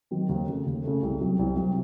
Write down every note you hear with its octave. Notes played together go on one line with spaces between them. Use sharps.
D#3 F#3 C4
D#2
C#3 A3
D#2
C#3 A3
C2
C3 F#3
C2
C3 F#3